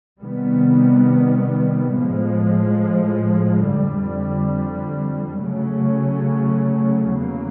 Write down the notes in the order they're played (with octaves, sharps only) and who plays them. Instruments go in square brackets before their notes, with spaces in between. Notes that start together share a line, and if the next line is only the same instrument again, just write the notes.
[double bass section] C3 D#3 G3 B3
A2 F3 G#3
F2 D3 G3
C#3 F#3 A3 C#4
E2 C#3 F#3 A#3